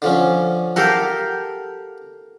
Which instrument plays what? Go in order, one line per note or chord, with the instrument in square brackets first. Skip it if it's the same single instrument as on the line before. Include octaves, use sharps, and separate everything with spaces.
[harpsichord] D3 F3 C#4
[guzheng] G4 A4 A#4 [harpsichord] F5 F#5